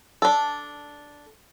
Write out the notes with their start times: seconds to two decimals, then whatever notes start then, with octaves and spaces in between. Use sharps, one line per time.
0.22 D4 A4